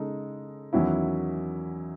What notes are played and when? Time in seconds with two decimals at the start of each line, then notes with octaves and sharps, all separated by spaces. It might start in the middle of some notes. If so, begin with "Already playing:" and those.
Already playing: C#3 G#3 D#4 A4
0.73 E2 D#3 F#3 C#4 E4